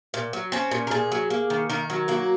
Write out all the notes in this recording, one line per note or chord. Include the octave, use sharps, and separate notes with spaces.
A#2
F#3
C4 C#4
A#2
A#4
A#2 G#4
F#3
A#3
D#3
D#3 A#4
F#3
A#3 F#4